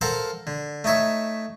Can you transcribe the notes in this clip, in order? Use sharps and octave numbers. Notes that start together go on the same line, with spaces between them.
A4 A#4 C5 F5 F#5
D3
A3 D#4 C#5 E5